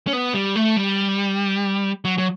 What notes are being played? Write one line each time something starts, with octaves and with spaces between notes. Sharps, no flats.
C#4
B3
G3
A3
G3
F#3
F#3